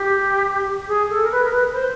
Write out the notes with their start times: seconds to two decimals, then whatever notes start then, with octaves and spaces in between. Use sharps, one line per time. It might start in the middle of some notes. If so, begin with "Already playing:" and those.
Already playing: G4
0.88 G#4
1.10 A4
1.24 A#4
1.31 B4
1.44 A#4
1.53 B4
1.67 B4
1.73 C5